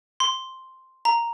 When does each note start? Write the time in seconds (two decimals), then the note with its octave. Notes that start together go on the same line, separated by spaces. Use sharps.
0.20 C6
1.05 A#5